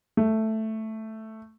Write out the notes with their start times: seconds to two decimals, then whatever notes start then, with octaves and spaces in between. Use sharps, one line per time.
0.17 A3